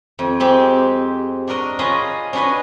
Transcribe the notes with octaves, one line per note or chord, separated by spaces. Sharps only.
F2
G#3 C4 G4
D4 F#4 A#4 D#5
C#4 F4 G#4 D#5 A#5 B5
C#4 D4 F#4 B4 D#5